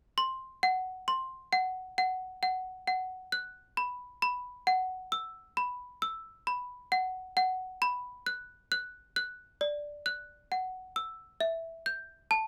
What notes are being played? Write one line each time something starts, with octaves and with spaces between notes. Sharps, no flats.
C6
F#5
C6
F#5
F#5
F#5
F#5
F#6
B5
B5
F#5
E6
B5
E6
B5
F#5
F#5
B5
F#6
F#6
F#6
D5
F#6
F#5
E6
E5
G6
A5